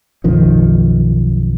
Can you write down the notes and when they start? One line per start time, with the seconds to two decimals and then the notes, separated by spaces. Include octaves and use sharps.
0.24 B1 F#2 D#3 F3